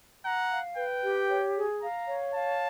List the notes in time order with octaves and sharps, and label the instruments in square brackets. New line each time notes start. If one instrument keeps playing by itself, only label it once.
[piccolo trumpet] F#5 [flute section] A#5
[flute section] F5
[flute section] B4 [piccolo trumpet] G5
[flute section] G4
C#5
G#4
[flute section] F5 [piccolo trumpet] A#5
[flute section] C#5
[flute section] F5 [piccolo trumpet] A5